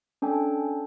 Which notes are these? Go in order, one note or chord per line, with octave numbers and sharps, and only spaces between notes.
C#4 D4 A4 G5 G#5